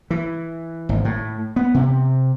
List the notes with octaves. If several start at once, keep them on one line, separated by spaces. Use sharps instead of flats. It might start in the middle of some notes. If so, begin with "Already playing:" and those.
E3
G#1
A2
B3
C3